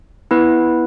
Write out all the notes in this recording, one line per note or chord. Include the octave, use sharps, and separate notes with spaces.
B3 E4 B4